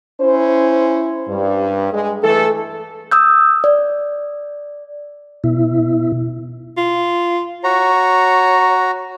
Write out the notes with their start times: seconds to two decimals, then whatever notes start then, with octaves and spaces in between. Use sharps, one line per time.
0.21 C#4 E4 C5
1.28 G2
1.92 G#3
2.23 E3 A3 A4
3.11 D#6 E6 G6
3.64 D5
5.44 B2 E4
6.77 F4
7.64 F#4 C#5 A#5